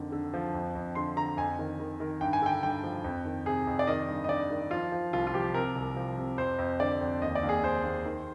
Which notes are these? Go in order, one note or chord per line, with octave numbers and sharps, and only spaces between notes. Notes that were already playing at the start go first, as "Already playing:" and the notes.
Already playing: F2 D3 D#3
D3
F3
F2
F2
D3 C6
D3 A#5
F2 G#5
D#3
D#3
D#3
G2 G5
G#5
D3 G5
G2 G5
F3
F2
D#3
C3 G#4
F2
D5
D#3 D#5
G2
D#5
G2 D5
D#3
F3 F4
F3
C2 F4
F4
F3 G4
C3 A#4
C2
F3
C3
F2 C5
F2
D3 D5
F2
D#2 D#5
D5
D#2
G#4
D#2 C5
D#2
D#3